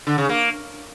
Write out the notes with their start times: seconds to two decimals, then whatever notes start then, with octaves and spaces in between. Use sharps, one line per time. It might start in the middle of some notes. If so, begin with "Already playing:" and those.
0.07 D3
0.18 C#3
0.29 A#3